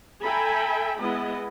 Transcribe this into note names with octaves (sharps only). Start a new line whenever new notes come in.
A4 E5 G5 G#5 A#5 B5
G#3 B3 E4 D#5